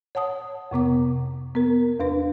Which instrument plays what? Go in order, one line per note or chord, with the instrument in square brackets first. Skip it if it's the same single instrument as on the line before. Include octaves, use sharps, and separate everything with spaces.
[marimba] C#5 F#5 A5 D#6
F2 C3 B3 D6
B3 A#4
E2 D4 B4